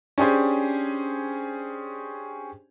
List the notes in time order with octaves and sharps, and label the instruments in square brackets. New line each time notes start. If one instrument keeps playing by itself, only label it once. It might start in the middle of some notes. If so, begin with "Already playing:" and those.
[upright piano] C#4 D4 G4 G#4 C5